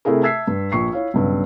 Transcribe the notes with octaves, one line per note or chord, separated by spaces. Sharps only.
C3 A3 E4 G#4 A#4
E5 A5 E6 G#6 B6 C7
G2
A#1 C#6 C7
E4 C#5 F5
B1 G2 C#3